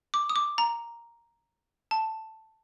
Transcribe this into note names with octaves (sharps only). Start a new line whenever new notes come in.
D6
D#6
D6
A#5
A5